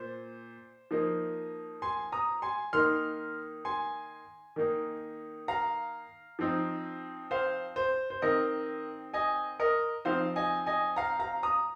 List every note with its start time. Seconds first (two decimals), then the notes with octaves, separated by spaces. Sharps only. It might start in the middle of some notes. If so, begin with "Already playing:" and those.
Already playing: A#2 C5
0.91 F3 A#3 D#4
1.82 G#5 C6
2.12 A#5 D#6
2.42 G#5 C6
2.73 D#3 A#3 D#4 C6 F6
3.65 G#5 C6
4.56 D#3 A#3 D#4
5.48 F5 A#5
6.39 F3 C4 D#4
7.31 C5 F5
7.76 C5
8.10 C5
8.22 D#3 C4 D#4 A#4 D#5
9.14 D#5 G#5
9.60 A#4 D#5
10.05 F3 C4 D#4 C5 F5
10.36 D#5 G#5
10.66 D#5 G#5
10.96 F5 A#5
11.19 F5 A#5
11.43 A#5 D#6